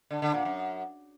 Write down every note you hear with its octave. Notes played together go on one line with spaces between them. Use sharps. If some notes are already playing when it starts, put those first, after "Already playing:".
D3
D3
A#2
F#2